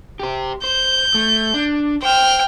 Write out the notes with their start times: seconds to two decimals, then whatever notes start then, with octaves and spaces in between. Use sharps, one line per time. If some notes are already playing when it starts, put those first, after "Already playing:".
0.20 G4 C5
0.64 C5 G6
1.14 A3
1.54 D4
2.02 C5 G5 F6